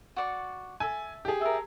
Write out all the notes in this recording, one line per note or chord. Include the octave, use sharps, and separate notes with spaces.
F#4 D5 C#6
A4 E5 G#5
G4 G#4
A4 A#4 E5